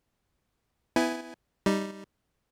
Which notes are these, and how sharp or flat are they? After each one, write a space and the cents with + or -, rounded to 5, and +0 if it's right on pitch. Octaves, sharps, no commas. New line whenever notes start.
B3 +25 E4 +0 G#5 +0
G3 +0 D#4 +0